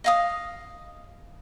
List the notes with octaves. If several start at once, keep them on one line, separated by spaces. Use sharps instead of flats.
D#5 F5 D#6